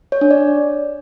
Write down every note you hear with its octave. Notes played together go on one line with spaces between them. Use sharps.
C#5
D4
D5